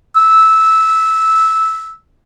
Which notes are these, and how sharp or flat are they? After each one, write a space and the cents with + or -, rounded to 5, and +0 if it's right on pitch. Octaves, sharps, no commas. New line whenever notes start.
E6 -15